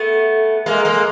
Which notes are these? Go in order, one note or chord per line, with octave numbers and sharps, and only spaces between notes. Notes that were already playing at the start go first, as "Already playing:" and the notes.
Already playing: A3 B3
G#3 A#3
G#3 A#3